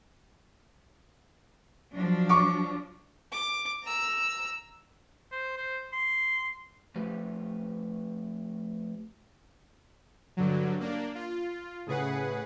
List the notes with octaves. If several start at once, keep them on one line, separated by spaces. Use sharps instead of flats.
F3 F#3 D4
C#6 D6
D6
A#5 E6
C5
C5
C6
F3 A3 G4 B4
G2 D3 F#3
A#3 D4
F4
A2 C#3 G#4 B4 F#5